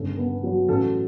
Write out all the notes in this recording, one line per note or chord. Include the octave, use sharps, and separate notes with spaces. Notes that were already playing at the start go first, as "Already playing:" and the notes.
Already playing: G1 C#3 A4
B3
F#3
A1 A4